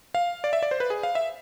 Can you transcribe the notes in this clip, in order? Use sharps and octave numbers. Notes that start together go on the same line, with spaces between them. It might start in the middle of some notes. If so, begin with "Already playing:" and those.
F5
D5
E5
D5
C5
B4
G#4
F5
E5